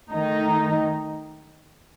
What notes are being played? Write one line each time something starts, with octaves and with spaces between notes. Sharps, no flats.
D#3 A3 D#4